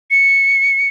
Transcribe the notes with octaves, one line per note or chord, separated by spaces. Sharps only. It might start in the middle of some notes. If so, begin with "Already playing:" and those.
C#7